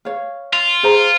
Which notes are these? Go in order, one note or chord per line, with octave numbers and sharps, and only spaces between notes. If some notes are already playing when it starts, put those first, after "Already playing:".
C#5 F5
F4
G#4 C5 A#5